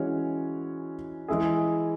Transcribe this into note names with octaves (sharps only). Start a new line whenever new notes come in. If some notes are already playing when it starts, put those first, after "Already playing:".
Already playing: E3 G#3 C#4 F#4 C#5
E3 G#3 E4 G#4